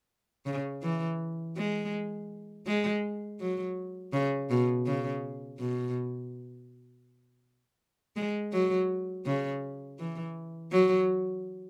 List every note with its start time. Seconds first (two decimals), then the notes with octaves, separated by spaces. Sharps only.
0.45 C#3
0.82 E3
1.56 G#3
2.67 G#3
3.40 F#3
4.13 C#3
4.50 B2
4.86 C#3
5.59 B2
8.16 G#3
8.53 F#3
9.26 C#3
9.99 E3
10.72 F#3